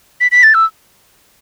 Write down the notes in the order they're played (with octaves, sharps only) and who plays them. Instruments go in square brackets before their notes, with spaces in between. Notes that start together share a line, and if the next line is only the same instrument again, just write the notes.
[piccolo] B6
B6
A6
E6